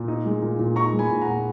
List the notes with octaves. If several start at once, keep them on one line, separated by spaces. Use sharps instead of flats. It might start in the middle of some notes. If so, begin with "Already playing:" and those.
Already playing: A#2
D#4
G#3
A#2
A#2
D#4 A#5 C#6
G#3
G#5 B5
A#2
F#5 A#5
A#2